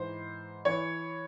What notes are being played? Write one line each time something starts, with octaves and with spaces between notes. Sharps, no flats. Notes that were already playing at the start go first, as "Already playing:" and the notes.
Already playing: G#2 E3 C5
E3 C#5